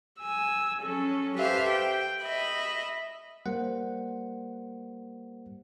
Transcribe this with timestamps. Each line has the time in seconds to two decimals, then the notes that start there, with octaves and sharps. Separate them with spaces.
0.20 G#5 E6
0.83 F#3 C#4 A4
1.38 G4 A4 B4 C5 E5 F5
1.70 G5
2.23 D#5 E5 B5
3.46 G3 A#3 C5 F#5